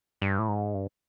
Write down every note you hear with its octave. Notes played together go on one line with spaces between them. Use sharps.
G2
A2
G#2
G2